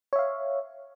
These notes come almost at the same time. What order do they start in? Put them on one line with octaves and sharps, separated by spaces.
C#5 E5 F5